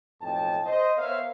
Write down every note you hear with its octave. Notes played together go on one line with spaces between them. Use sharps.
B1 F2 A2 D#5 G5 A5
C5 D#5
B3 A#4 C5 C#5 E5 F5